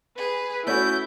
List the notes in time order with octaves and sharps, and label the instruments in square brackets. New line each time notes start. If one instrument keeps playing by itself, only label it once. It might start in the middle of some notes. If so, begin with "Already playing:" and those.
[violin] G#4 [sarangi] B4
[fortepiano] A3 C#4 F#4 [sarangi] E4 [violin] G6